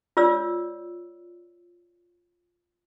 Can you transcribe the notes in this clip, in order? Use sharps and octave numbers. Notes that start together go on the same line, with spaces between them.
F4 C#5 D5 E6